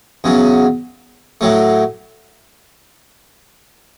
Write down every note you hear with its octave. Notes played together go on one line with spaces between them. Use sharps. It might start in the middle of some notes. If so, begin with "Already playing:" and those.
E2 C#3 F#3
A2 F#3 A3